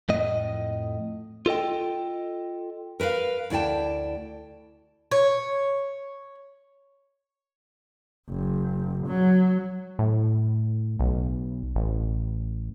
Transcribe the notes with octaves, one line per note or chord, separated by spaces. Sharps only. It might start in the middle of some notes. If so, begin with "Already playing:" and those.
F2 A2 D#5
F4 A4 D#5 G5
A#4 B4 E5 F5
D2 E4 D5 G5 A5
C#5
F#1
F#3
A2
B1
A1